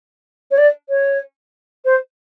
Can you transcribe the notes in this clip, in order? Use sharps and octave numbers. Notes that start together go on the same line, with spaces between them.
C#5
D5
C#5
C5